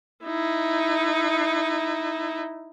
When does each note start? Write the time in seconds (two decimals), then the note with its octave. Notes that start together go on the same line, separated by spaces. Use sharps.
0.25 D#4 E4